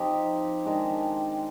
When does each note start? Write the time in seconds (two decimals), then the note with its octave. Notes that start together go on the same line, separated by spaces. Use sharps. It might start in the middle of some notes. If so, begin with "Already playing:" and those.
Already playing: F3 C4 D#4 G4
0.65 D#3 G#3 D4 G4